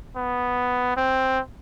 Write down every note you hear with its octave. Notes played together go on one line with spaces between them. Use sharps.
B3
C4